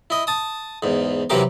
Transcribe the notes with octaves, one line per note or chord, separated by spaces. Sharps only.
E4 D#5
A5 D#6
E2 G#2
C3 E3 F#3 G4 A#4 D6